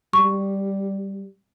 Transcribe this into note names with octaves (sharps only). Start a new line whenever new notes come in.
G3 C#6